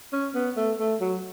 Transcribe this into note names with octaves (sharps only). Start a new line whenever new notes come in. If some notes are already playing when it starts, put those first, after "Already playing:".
C#4
B3
A3
A3
F#3